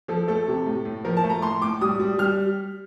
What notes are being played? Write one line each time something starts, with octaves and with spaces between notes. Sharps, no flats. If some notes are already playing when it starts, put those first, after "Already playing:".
F3 A4
A3 A4
C3
A2
A2
F3 A#4
A5
A3
A#5
A2 C6
A2 D6
G3 D#6
G3
G3 F6